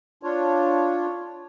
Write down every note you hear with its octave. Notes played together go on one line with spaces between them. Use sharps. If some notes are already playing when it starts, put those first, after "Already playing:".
D4 F4 C#5